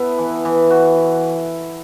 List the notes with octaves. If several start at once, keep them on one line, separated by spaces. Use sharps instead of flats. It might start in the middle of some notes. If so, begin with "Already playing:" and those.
Already playing: B3 E4 A4
E3
E3
F#4